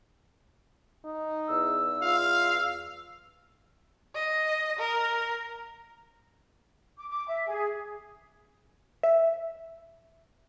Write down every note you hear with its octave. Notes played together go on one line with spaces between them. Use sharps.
D#4
E2 E6
F4 F5
D#5
A#4
D6
D6
E5
G#4
E5